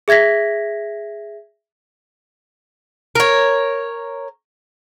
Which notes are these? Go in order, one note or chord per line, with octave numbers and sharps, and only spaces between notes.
G#4 E5 G#6 A#6 B6
A#4 C#5